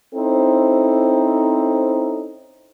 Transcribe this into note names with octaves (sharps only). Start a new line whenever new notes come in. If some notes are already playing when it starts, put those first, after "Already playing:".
C4 C#4 D#4 E4 A4 C5